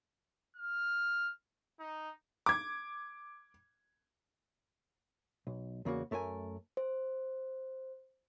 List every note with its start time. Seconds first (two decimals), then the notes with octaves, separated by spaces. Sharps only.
0.56 F6
1.80 D#4
2.46 D6 G#6
5.47 B1
5.85 E2 C#3 A#3 F#4
6.11 F#2 A3 A#4 C#5 G#5
6.77 C5